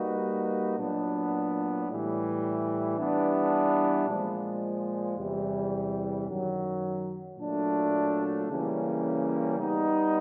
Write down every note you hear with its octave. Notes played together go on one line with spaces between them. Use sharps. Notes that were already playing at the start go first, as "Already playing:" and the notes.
Already playing: G3 A#3 D#4 F#4 B4
A#2 F#3 B3 D4
A2 E3 G3
E3 G3 B3 D4
A#2 F3 G#3
E2 C3 E3 G3
F#2 D#3 F#3
A#2 F#3 A3 D4
C#3 E3 G3 A#3 C#4
G3 B3 D#4